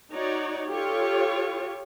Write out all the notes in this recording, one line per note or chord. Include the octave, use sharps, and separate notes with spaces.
D#4 F#4 C#5 D5
F4 G4 A4 C#5